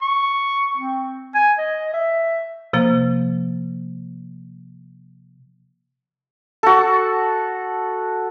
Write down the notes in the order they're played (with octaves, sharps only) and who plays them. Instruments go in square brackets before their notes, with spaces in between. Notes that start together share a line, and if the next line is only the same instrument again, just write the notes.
[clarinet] C#6
C4
G#5
D#5
E5
[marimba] C3 F3 A#3
[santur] F#4 A4